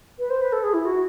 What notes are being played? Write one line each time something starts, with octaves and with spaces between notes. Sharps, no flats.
B4
C5
B4
A4
G#4
E4
F#4